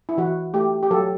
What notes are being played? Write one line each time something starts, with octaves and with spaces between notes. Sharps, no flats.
E4
E3 F#4
A3 G4
G4
F#3 A4